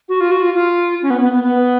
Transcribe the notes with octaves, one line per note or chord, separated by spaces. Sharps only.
F#4
F4
F#4
F4
F4
C#4
B3
B3
B3
B3